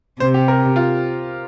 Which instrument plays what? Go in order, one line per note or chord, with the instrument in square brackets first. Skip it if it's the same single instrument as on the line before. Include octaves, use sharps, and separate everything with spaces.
[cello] C3 [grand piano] C5
[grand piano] G4
A#4
F4